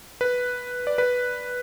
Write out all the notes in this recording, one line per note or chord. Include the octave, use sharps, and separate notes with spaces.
B4
D5
B4